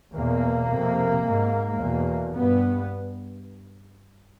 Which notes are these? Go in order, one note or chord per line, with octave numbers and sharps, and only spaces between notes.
E2 B2 A#3
F2 C3
G#2
E2 B2
G2 B3